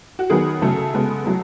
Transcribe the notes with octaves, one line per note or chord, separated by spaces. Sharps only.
F#4
D#3 F#3 B3 G#4
C#3 F#3 A3 A4
C#3 G#3 B3
F#3 A3